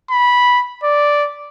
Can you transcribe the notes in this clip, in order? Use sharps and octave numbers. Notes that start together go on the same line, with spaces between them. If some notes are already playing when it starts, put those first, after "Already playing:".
B5
D5